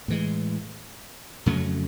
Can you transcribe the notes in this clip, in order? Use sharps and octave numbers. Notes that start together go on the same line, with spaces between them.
A2 E3 G#3
F2 C#3 F#3 A3